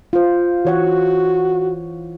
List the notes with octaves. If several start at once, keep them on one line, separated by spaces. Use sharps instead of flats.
F4 C5
E3 F#4 C#5 F#5